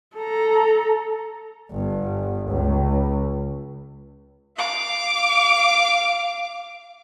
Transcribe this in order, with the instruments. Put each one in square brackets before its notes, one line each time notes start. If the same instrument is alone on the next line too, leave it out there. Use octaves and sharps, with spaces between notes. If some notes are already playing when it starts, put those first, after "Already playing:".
[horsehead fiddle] A4 A#5
[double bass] G1
C#2
[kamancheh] F5 D6